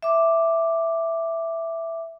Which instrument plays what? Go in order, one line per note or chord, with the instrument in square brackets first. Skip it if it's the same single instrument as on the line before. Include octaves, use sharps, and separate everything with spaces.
[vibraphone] E5 D6